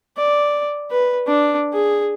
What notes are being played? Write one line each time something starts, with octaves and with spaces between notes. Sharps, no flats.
D5
B4
D4
G#4